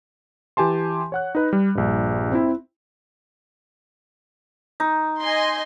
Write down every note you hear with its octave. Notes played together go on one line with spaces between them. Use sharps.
E3 G4 G#5 A5 C6
C#5 F#5 F#6
D#4 B4
G3
A#1 G2
C4 E4
D#4
D#5 G#5 C6